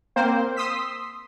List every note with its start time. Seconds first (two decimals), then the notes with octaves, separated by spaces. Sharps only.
0.16 A#3 C4 C5
0.57 C6 D#6 E6 B6